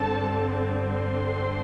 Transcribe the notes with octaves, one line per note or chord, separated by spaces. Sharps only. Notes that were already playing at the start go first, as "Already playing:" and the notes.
Already playing: G2 D3 C4 A4 A5
C5 C6